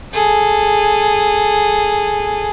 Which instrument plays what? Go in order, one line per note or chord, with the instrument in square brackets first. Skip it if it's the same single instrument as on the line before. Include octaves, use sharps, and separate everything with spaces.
[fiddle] G#4 A4